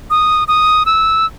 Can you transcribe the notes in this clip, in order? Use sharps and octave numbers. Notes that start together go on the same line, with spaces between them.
D#6
D#6
E6